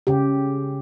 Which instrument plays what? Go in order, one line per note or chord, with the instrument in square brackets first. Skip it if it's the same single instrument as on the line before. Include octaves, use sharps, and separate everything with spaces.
[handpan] C#3 G4